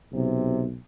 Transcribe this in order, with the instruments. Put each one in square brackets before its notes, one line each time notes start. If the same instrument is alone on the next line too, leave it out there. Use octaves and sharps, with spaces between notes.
[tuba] B1 [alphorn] C3